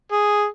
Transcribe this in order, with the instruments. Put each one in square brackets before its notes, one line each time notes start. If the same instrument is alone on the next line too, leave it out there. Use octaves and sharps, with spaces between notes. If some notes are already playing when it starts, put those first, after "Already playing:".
[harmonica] G#4